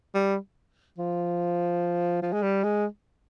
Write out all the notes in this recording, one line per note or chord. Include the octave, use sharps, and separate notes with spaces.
G3
F3
F3
G#3
G3
G#3